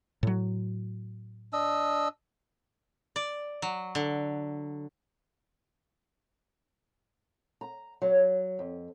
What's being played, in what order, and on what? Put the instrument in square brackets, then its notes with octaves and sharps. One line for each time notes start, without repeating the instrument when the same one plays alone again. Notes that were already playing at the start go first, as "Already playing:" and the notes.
[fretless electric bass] A2 F#3
[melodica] D4 D#5 E6
[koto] D5
F#3
D3
[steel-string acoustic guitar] A#5
F#3
F2